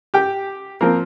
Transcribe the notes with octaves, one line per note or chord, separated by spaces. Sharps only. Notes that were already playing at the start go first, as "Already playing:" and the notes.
G4 G5
F3 A#3 C4 A#4